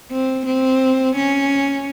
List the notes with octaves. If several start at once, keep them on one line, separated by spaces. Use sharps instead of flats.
C4
C4
C#4